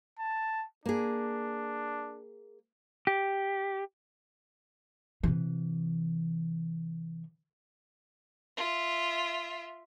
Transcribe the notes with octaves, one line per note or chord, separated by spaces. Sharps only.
A5
A#3 D4 G#4
G4
C3 E3
F4 E5